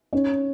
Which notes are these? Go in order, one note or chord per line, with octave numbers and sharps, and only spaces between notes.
C#4